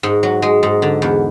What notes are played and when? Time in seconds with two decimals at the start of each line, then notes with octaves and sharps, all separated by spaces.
0.03 G#2
0.23 F#3
0.42 G#3
0.63 G#2
0.82 D3
1.02 E2